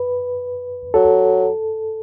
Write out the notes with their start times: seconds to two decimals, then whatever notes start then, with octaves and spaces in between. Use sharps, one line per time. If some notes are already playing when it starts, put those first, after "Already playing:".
Already playing: B4
0.94 F#3 A4